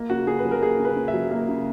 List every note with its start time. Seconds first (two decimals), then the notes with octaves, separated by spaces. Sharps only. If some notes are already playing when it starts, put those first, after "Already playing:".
Already playing: A#3
0.10 C#3 F#4
0.27 C#3 G#4
0.39 B4
0.45 F#3
0.51 A#4
0.62 A#3 G#4
0.80 C#3
0.85 B4
0.96 C#3
1.08 E5
1.14 F#3
1.31 A#3
1.49 C#3